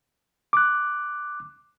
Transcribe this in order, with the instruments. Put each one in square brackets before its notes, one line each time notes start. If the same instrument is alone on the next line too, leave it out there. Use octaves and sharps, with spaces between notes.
[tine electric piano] D6 F#6